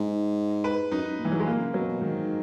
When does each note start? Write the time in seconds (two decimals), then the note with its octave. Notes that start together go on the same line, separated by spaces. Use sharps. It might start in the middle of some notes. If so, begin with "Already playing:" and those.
Already playing: G#2
0.64 B4
0.92 F#2 D#4
1.19 A#2
1.25 E3
1.32 G#2 F#3
1.40 G#3
1.47 A#2 A#3
1.60 C#3
1.74 B2 F#3
1.88 B2
2.02 G#2 D#3